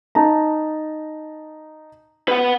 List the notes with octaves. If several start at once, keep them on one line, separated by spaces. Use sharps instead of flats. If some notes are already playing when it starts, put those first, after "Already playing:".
D#4 A5 A#5
B4 F#5